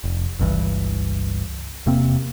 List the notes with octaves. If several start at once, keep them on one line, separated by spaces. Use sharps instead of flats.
F1
G1 C#2 G2 E3
E1 C3 A#3 C4